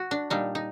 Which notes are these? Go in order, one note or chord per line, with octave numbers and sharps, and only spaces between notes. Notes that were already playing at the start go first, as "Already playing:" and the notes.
Already playing: F#4
D4
A#2 G3 D4 D#4
D#4